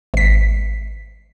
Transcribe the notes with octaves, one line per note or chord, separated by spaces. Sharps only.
G#1 B6